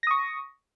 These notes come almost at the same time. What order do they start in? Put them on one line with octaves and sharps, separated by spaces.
A#6 D#6 C#6